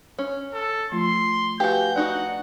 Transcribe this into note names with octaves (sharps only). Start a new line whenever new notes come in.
C#4
A4
F3 A3 F4 C6
F#4 G4 B4 F5 G#5 G6
D4 D#4 F#4 F#5